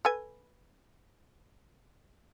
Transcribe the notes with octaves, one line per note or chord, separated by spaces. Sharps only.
A4 B4 G#5